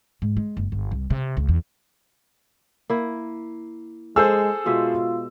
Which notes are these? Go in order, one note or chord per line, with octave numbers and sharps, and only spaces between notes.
G#2
G#3
F#1
G1
C2
C3
C#2
E2
A#3 E4
G#3 G#4 A4 C5 E6
B2 G#3 F4 E5